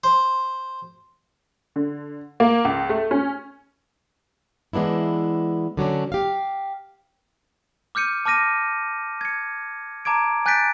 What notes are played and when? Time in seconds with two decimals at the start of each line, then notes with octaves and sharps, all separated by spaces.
0.04 C5
1.76 D3
2.40 A#3
2.65 C#2
2.89 A3
3.11 C#4
4.73 E3 G#3 B3 D4 E4
5.77 D3 F#3 C#4 D4
6.12 G4 F5
7.95 D6 F6 G6 C#7 D#7
8.26 A5 D6 F6 A#6 D#7
9.21 G#6 C#7
10.05 A5 A#5 D6 G#6 D7
10.46 G#5 F#6 G6 A6 B6 D7